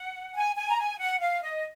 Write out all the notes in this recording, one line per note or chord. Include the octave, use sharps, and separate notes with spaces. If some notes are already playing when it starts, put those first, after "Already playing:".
Already playing: F#5
G#5
G#5
A#5
G#5
F#5
F5
D#5